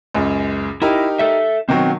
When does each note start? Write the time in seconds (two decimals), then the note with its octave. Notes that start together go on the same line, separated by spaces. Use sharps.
0.15 C#2 F#2
0.82 D#4 E4 G4 A#4
1.19 A4 E5
1.69 B2 D#3 F#3 C4